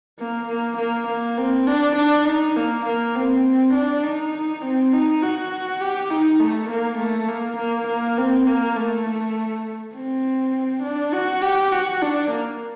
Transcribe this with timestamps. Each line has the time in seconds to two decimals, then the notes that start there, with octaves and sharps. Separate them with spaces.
0.19 A#3
0.48 A#3
0.78 A#3
1.08 A#3
1.38 C4
1.67 D4
1.96 D4
2.25 D#4
2.56 A#3
2.85 A#3
3.15 C4
3.74 D4
4.04 D#4
4.62 C4
4.93 D#4
5.22 F#4
5.81 G4
6.10 D#4
6.40 A3
6.70 A#3
6.98 A3
7.28 A#3
7.58 A#3
7.88 A#3
8.18 C4
8.47 A#3
8.76 A3
9.94 C4
10.83 D4
11.13 F#4
11.42 G4
11.72 F#4
12.02 D4
12.31 A#3